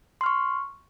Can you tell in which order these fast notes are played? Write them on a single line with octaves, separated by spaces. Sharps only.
C6 F6 C#6